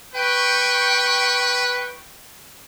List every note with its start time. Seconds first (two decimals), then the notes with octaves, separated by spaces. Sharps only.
0.16 B4 G5 C#6